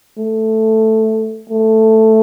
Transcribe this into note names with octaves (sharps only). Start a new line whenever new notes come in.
A3
A3